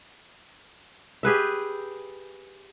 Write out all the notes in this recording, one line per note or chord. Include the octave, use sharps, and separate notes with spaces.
G4 G#4 B4 E5